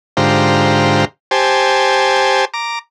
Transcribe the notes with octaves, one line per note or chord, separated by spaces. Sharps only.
G#2 D3 F4 G4 C5 A#5
G4 C5 G#5 A5
A#5 D6